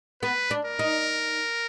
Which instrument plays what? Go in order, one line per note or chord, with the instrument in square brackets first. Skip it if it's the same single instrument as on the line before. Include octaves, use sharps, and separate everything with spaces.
[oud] B3 [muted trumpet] B4
[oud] D4
[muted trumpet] A#4
[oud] D#4